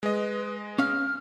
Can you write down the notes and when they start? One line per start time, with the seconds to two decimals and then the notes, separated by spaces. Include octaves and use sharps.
0.03 G#3 B4 D#5
0.79 C#4 F5 F6